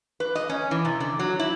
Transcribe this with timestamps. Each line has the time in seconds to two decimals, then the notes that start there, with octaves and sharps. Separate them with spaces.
0.20 B4
0.35 D#5
0.49 C#4
0.71 E3
0.85 C3
1.00 D3
1.19 F#3
1.39 E4